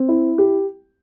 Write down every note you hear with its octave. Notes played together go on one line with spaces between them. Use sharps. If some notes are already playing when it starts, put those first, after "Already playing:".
Already playing: C4
E4
G4